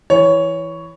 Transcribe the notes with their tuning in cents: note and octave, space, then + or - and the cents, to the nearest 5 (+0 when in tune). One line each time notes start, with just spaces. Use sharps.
E3 +0 C#5 +10